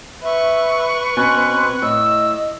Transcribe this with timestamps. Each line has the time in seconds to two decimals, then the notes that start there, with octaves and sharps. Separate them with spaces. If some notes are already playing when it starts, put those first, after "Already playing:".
0.22 B4 E5 C#6
1.17 B2 C4 C#4 F#6
1.82 A2 D#5 E6